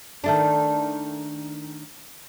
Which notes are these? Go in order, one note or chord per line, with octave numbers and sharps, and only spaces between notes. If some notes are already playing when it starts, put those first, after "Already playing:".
D#3 A3 D4